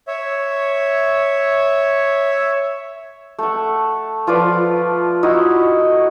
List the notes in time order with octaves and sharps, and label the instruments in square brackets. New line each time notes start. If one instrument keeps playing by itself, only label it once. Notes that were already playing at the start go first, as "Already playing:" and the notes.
[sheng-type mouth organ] C#5 E5
[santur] A3 F#5
F3 F4 B4 D5
D#4 E4 F#4 D#5